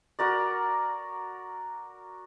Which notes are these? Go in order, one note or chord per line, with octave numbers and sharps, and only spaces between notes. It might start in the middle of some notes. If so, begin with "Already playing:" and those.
F#4 A#4 D5